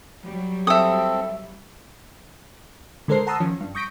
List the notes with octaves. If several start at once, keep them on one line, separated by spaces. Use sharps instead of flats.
F#3 G3
C4 A4 E5 D#6
D3 G#3 A4 A#4 C5 C7
F#5 A5 A#5 C6 D#6 E6
D#3 F3 C#4
G2
C#6 D#6 G6 A#6 B6 D7